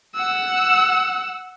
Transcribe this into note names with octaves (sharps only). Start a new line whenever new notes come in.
F#5 E6